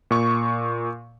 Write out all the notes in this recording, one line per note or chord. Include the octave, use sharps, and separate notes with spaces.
A#2 C#6